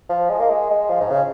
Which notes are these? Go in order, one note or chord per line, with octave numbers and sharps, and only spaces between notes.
F3
G#3
A#3
G#3
G#3
F3
G#2
C#3